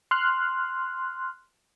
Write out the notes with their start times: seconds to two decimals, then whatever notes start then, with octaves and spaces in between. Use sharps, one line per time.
0.11 C6 F6 F#6